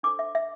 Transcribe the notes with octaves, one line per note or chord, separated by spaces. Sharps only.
D4 A4 C5 D6
E5
E5